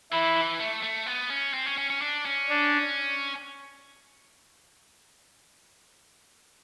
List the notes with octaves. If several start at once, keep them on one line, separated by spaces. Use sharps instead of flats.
E3 E4
E3
A3
A3
B3
C#4
C4
C#4
C#4
C#4
D4
C#4
D4